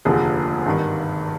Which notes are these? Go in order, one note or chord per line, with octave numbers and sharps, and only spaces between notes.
F1 D#2 D3 F3 G#4
G#1 G2 D#3